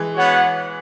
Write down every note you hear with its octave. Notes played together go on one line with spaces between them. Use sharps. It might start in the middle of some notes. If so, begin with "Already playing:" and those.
Already playing: E3 G#3
B3 F#4 C#5 F#5